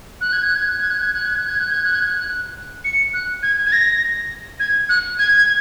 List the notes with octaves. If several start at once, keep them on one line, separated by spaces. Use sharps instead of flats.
F#6
G#6
F#6
G#6
F#6
G#6
F#6
G#6
F#6
G#6
F#6
G#6
F#6
G#6
F#6
G#6
F#6
C#7
F#6
G#6
G#6
A#6
G#6
F#6
G#6
G#6